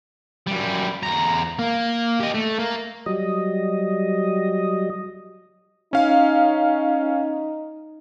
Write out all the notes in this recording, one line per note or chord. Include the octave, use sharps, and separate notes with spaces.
F#2 G3
E2 A#5
A#3
G4 D#5
A3
A#3
F#3 G3 D#5
C#4 D#4 F5